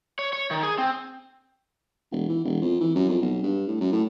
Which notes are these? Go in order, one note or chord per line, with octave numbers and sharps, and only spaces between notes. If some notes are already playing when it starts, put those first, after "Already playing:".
C#5
C#5
D#3
G#4
C4
E1
E3
E1
F2
E3
F#2
F2
B1
G2
A2
F#2
A2